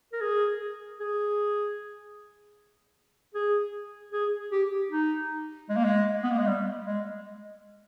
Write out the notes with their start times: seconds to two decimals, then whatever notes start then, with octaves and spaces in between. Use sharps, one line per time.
0.13 A#4
0.21 G#4
1.00 G#4
3.35 G#4
4.13 G#4
4.52 G4
4.91 D#4
5.69 G#3
5.77 A#3
5.85 G#3
6.23 B3
6.31 A#3
6.39 G#3
6.47 G3
6.87 G#3